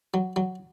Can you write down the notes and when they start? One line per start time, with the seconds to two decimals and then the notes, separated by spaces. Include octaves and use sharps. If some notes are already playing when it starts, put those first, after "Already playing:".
0.14 F#3
0.36 F#3